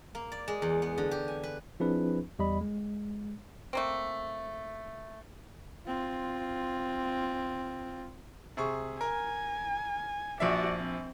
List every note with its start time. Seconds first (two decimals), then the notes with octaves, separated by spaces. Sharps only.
0.15 A#3
0.32 D5
0.48 G#3
0.62 E2
0.82 B3
0.98 D3
1.11 G4
1.28 G#5
1.43 B4
1.80 F3 C4 D4 E4 G#4 B4
2.39 E2 G3 D#5 B5
2.61 G#3
3.73 A3 A#3 C4
5.87 C4 F4
8.57 C3 G#4 C#6
9.01 A#4 G#5
10.40 A#1 F3 F#4 D5 E5
10.79 C4